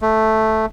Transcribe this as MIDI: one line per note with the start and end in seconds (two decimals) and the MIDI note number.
0.02 0.66 57